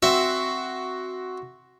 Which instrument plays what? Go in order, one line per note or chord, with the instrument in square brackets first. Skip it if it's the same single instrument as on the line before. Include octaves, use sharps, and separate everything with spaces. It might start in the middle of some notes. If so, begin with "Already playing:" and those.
[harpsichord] C4 E5 [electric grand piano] F#4